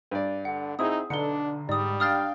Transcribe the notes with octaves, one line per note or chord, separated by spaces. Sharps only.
G2 D5
D3 F#5
C4 D#4 E4 G#4 D#6
B1 D3 D4 C#7 G7
G#2 G3 D5 D#6
D4 F5 G5 D#6 F6 A6